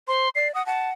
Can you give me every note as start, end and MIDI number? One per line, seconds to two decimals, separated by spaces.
0.08 0.28 72
0.08 0.29 84
0.35 0.54 74
0.35 0.48 96
0.55 0.64 78
0.55 0.65 87
0.66 0.93 78
0.66 0.90 81